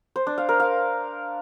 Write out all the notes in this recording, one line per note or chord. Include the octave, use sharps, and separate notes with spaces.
C5
D4
F5
A#4
F5